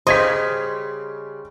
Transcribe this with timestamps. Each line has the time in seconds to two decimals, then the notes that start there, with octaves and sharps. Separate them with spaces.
0.07 C#3 G3 G4 C5 D#5 C6 G#6 B6